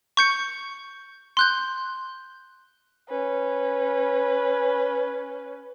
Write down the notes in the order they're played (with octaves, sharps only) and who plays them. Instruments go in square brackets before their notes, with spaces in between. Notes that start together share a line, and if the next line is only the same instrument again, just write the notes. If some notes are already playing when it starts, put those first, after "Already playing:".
[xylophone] C#6 G6 C#7
C6 F#6 G6
[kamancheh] C#4 B4